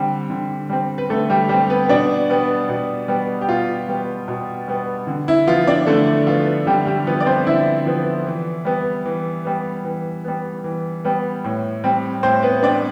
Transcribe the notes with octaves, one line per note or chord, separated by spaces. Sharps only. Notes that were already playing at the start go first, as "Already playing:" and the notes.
Already playing: D3 G3 C4
D3
G3 C4
B4
D3 A3 A4
G3 G4
G3 G4
C4
B3 B4
B2 D4 D5
G3 B3
B2
G3 B3
G4
B2 F4
G3 B3
B2
G3 B3
D3
E4
F3 B3 F4
D4 D5
D3 A3 A4
F3 B3 F4
D3 G3 G4
G3 G4
F3 B3 B4
D5
C4 C5
D3 E4 E5
F3 B3
E3
G3 B3
E3
G3 B3
E3
G3 B3
E3
G3 B3
A2
G3 C4
A2 C4 C5
B3 B4
G3 C4 D4 D5